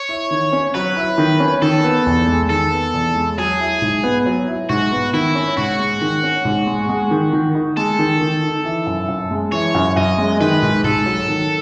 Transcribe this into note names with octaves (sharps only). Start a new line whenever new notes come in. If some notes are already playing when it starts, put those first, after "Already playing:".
Already playing: C#5
E4
D#3
C#4
F#3 B4
E4
D#3
C#4
D#3 A4
B3
E2
G#3
D#3 A4
B3
E2
G#3
F#3 G#4
E4
G#2
B3
F#3
E4
G#2 F#4
B3
D#3 E4
C#4
G#2 F#4
G#3
D#3
C#4
G#2
G#3
G#3
D#3
D#3
D#4
G#3 A4
D#3
D#3
D#4
E3
F#2
F#2
G#3
E3 C#5
F#2
F#2 D#5
G#3
D#3 B4
G#2
G#2 A4
F#3
D#3